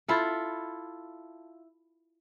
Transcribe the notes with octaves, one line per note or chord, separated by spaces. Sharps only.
E4 F4 A4